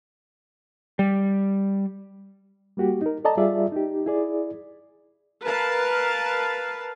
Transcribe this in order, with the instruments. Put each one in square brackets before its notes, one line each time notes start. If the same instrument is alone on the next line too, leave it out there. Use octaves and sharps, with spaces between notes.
[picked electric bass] G3
[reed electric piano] G3 A#3 F#4 G4
D#4 A#4
A4 D5 D#5 A5 A#5
G3 F4 G#4 D5 E5
D#4 G4
E4 G#4 D5
[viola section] A#4 B4 F5 A5